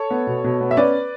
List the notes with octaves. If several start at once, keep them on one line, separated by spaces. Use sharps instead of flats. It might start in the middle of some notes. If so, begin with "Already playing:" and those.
Already playing: A4 C#5
B3
B2
B2
B3
E5
C#4 B4 D5